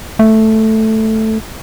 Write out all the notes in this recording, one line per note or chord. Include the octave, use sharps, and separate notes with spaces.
A3